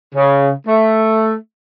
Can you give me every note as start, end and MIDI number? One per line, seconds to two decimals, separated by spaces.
0.15 0.51 49
0.68 1.33 57